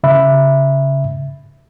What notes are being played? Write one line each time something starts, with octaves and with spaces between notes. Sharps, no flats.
C#3 E5 B5